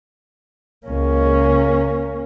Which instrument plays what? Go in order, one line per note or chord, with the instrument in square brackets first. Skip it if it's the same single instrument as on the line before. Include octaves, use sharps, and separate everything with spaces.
[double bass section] C#2 [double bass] A#3 C#4